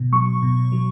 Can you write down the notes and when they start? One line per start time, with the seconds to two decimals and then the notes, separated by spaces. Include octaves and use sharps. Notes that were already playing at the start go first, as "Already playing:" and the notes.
Already playing: B2
0.12 F#3 C#6
0.42 B2
0.72 F#3